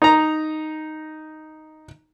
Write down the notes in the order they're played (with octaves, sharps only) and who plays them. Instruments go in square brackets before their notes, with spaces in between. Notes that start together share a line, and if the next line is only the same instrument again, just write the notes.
[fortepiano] D#4 A#5